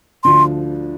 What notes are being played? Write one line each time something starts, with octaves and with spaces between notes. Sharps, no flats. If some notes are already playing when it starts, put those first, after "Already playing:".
D2 D3 F3 C6